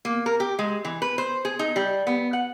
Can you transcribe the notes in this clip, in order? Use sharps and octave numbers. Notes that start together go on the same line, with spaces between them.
A#3
A#4
G4
G#3
E3
B4
C5
G#4
D#4
G3
B3
F#5